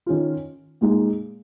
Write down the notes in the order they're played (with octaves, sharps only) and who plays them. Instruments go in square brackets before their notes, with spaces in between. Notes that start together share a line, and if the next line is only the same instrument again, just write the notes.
[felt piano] D#3 C#4 F4
A#2 G#3 D#4